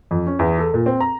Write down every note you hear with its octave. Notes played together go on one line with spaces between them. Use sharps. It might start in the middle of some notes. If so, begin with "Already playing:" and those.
F2
C#4
E2
A4
A#2
C4
A#5